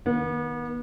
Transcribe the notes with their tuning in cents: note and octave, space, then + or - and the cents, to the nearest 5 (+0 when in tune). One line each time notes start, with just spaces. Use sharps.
D#3 +0 B3 -35